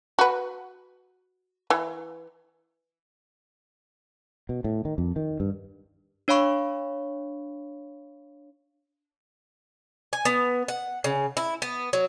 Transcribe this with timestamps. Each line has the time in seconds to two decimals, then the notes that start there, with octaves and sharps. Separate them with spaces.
0.19 F#4 B4
1.70 E3
4.49 B2
4.64 A2
4.85 D#3
4.98 F2
5.16 D#3
5.40 G2
6.28 D4 C#5 F5 B5 C#6
10.13 G#5
10.25 B3
10.68 F#5
11.04 C#3
11.37 E4
11.62 B3
11.93 F#3